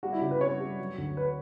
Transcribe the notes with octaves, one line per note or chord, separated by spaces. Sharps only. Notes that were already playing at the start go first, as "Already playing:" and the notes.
G3 F#4
E4
C#3 G4
B4
G3 C#5
G3
F#3
D2
B4